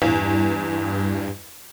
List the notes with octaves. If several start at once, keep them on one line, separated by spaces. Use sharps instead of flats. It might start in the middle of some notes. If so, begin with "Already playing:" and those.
E2 G2